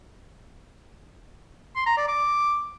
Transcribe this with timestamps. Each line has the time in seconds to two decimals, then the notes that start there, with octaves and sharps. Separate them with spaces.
1.76 C6
1.86 A#5
1.97 D5
2.08 D6